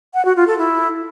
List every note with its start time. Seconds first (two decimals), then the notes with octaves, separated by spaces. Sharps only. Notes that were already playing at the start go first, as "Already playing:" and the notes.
0.14 F#5
0.25 F#4
0.36 F4
0.47 A4
0.58 E4